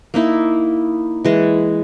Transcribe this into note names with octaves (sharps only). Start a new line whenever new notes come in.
A#3 D#4 E4
E3 G#3